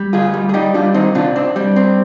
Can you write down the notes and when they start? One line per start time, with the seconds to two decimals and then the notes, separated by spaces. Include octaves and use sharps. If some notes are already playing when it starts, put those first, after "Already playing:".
Already playing: G3
0.13 D2 F4 G#4
0.34 G3
0.49 G#4
0.54 G3 D#4 G4
0.74 G3 D4 F4
0.94 D#3 C4 D#4
1.15 C3 D4 F4
1.36 C4 D4
1.56 G3 D4
1.76 C4